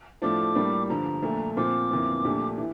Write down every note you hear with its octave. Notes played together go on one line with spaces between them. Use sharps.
A2 F3 A3 D4 F4 D6
A2 G3 A#3 D4
G2 D3 F3 A#5
A#1 A#2 A3
A#2 F3 C4 F4 D6
G1 F2 E3 A#3 F4
A#1 A#2 A3 D4 G4
A2 E3